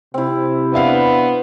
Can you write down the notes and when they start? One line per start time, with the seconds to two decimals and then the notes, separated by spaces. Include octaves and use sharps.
0.14 C3 C4 E4
0.74 B3 D4 E5 F5